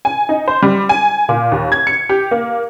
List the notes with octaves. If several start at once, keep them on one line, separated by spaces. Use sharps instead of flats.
G#5
D#4
C5
G3
G#5
A#2
D#2
G#6
C#7
G4
A#3